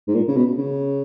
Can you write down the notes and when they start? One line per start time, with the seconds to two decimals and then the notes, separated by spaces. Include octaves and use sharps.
0.08 G#2
0.15 A#2
0.28 C#3
0.37 B2
0.58 C#3